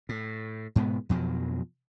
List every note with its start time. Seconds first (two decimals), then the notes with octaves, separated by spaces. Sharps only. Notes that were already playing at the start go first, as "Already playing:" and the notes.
0.09 A2
0.76 G#2 B2 G#3 B3
1.09 F2 B2 F3 F#3